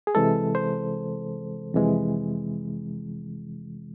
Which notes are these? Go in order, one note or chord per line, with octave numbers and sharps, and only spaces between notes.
G#4
C3 E3 G#3 A4
C5
F2 C3 E3 G#3